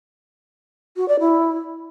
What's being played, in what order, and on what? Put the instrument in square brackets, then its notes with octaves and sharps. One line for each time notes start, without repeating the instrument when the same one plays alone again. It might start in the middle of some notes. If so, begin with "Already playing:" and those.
[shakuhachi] F#4
D5
E4